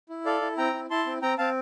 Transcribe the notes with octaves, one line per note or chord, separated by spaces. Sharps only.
E4
A4 D5 F5
E4
C4 G5 A#5
E4
E4 A5 C6
C4
C4 G5 A#5
C4 F5 A5